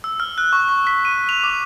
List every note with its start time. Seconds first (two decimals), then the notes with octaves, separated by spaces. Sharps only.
0.04 E6
0.20 F6
0.38 F#6
0.53 C#6
0.68 C#6
0.87 B6
1.05 D#7
1.29 F7
1.44 D6